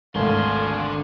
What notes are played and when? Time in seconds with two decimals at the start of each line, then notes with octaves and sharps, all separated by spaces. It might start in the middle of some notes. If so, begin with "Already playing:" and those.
0.15 G#1 D2 D3 A4 F5 G#5 C6